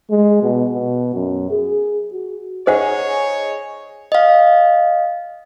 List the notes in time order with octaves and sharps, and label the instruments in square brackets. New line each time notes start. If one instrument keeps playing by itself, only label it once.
[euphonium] G#3
B2
B2
F#2
G#4
F#4
[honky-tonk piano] D#4 G#4 [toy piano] C5 F#5 [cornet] C#5
[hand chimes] D#5 F5